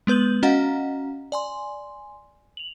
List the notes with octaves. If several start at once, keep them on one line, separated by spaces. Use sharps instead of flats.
G#3 B3 B4 G6 F#7
C#4 F#4 D#5 F5 F#5 A#5
D5 G#5 C6
F7 F#7